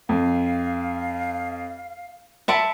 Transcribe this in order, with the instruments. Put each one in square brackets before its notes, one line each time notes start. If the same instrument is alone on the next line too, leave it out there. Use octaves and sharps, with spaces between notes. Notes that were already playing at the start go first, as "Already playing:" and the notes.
[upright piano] F2 [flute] F5
[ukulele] E5 A5 B5 [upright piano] C#7 D7